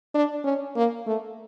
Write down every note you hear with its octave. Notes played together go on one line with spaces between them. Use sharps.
D4
C#4
A#3
A3